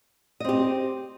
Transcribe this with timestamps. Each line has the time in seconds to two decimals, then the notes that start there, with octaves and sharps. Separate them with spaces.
0.40 D#5
0.45 C4
0.49 G4